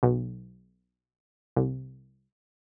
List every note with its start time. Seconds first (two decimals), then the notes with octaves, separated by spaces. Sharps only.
0.03 B1
1.56 C2